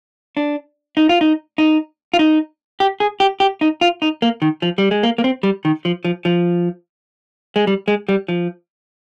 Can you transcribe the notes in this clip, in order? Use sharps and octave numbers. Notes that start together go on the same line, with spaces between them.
D4
D#4
F4
D#4
D#4
F4
D#4
G4
G#4
G4
G4
D#4
F4
D#4
A#3
D#3
F3
G3
G#3
A#3
A#3
C4
G3
D#3
F3
F3
F3
G#3
G3
G#3
G3
F3